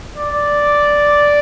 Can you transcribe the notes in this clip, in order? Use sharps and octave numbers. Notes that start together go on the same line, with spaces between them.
D5